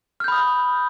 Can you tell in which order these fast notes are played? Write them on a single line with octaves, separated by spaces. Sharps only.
F6 G6 B5 D#6